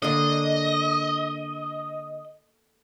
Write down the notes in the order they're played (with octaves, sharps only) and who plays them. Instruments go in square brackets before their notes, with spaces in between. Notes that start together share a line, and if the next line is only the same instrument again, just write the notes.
[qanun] D3 A#3 D4 [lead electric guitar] D#5